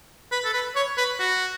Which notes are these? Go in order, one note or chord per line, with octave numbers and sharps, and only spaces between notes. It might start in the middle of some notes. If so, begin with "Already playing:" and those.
B4
A4
B4
C#5
B4
F#4